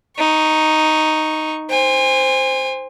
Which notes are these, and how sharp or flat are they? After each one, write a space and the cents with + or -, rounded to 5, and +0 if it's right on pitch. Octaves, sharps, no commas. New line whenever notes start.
D#4 +0 C#6 +0
C5 +0 G#5 -35